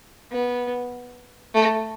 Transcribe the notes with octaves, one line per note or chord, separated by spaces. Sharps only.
B3
A3